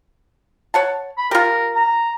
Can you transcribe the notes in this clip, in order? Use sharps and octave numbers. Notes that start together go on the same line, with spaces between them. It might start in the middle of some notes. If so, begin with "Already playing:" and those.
C#5 F#5 A5
B5
F4 G4 A#4
A#5